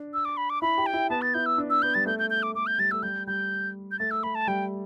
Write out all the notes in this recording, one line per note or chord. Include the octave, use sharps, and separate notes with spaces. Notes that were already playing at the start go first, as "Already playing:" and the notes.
Already playing: D4
E6
D6
B5
D6
E4 B5
G4
G5
E4
B3 A5
A6
E4 G6
E6
D4
E6
B3 G6
G3 A6
A3 G6
G6
G6
D6
A3 D6
G6
G3 A6
A3 E6
G3 G6
G3 G6
G6
A3 A6
E6
A3 B5
A5
G3 G5